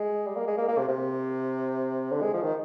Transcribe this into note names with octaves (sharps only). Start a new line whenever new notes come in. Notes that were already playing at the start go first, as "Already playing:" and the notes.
Already playing: G#3
G3
A#3
G#3
A#3
A#3
C3
C3
D3
G#3
F3
D#3